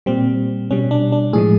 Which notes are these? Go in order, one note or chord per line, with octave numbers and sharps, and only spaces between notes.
A#2 G3 C4
B2 G3 C#4
D4
D4
A2 F3 G#3 G#4